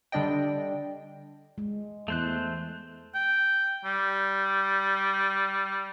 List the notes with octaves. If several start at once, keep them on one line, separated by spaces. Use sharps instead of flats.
D3 G3 D4 D5 D#5 G5
G#3
E2 A3 C5 F#6
G5
G3